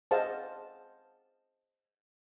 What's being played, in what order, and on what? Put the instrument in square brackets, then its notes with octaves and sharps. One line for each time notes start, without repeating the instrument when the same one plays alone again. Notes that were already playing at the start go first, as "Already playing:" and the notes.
[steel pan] G#4 C5 D#5 F5 F#5 A5